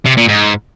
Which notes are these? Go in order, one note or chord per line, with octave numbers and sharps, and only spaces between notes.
C3
A#2
G#2